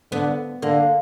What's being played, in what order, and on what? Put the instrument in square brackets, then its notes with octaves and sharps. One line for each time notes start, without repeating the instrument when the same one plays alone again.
[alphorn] D3 [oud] B3
[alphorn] D3 [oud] A#3